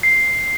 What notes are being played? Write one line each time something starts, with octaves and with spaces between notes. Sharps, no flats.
C7